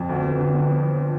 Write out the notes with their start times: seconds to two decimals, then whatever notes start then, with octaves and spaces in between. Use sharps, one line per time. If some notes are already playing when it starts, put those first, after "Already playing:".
Already playing: F2
0.09 D2
0.24 B3
0.39 D3
0.54 B3
0.68 F3
0.83 F3